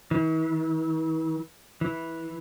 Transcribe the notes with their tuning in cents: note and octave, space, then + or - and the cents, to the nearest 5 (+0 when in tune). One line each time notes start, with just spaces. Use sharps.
E3 -45
E3 -10